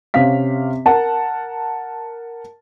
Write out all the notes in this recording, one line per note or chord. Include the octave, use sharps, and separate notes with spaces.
C3 C#4 G4 F5 B6
A#4 F#5 A5